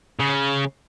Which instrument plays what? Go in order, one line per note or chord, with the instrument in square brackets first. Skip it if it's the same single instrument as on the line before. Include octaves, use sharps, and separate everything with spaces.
[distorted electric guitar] C#3